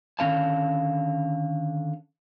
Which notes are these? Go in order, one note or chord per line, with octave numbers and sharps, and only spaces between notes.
D3 D#3 C#4 F5 A5